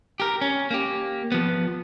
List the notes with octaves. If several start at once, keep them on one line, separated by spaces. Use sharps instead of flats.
G4 A#4
C#4
A#3 G4
F3 B3